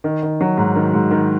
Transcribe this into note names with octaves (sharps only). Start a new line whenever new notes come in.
D#3
D#3
F#3
G#2
D#3
G#2
D#3